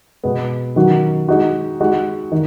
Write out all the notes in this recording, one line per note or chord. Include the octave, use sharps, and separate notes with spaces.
B2 G#3 B3
D#3 F#3 C#4 F#4
G#3 D#4 F#4
G#3 D#4 F#4
D#3